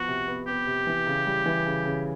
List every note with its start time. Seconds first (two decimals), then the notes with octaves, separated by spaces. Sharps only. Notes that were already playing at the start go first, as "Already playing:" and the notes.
Already playing: F3 B3 F#4
0.08 C3
0.28 B3
0.47 B3 G4
0.67 C3
0.87 E3
1.07 C#3
1.27 G3
1.46 E3
1.66 C#3
1.86 C#3